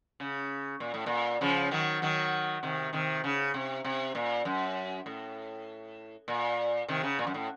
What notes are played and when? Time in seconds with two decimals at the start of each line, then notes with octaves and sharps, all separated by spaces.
0.20 C#3
0.80 A#2
0.94 A2
1.06 A#2
1.41 C#3 F3
1.71 D#3 F#3
2.02 D#3 F#3
2.63 C3 D#3
2.93 C3 D#3
3.24 C#3
3.54 C3
3.85 C3
4.15 A#2
4.45 F#2
5.06 A2
6.28 A#2
6.88 C3 D#3
7.03 C#3
7.19 A#2
7.27 F#2
7.34 A2